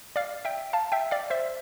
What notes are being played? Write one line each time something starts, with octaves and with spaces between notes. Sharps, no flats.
D5 F5
E5 G5
F5 A5
E5 G5
D5 F5
C5 E5